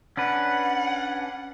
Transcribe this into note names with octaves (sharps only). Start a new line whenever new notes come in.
C#4 D4 B4 F#5